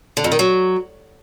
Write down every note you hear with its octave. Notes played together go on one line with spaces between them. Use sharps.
D3
F2
D#3
F#3